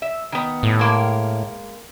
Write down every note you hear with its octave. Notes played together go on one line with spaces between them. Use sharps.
E5
D#3 B3
A2
G#3 A#3 A#4